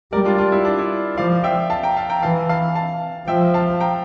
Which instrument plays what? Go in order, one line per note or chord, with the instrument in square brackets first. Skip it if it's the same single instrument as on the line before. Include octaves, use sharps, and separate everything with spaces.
[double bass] G3 [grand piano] A#4 D5
[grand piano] D4 F4
D4 F4
E4
D4
E4
[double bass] F3 [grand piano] D5 F5
[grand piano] E5 G5
F5 A5
G5 A#5
F5 A5
G5 A#5
[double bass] E3 [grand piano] F5 A5
[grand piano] F5 A5
F5 A5
[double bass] F3 [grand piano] E5 G5
[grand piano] F5 A5
G5 A#5